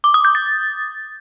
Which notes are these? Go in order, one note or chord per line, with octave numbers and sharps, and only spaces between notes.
D6
D#6
G6
A6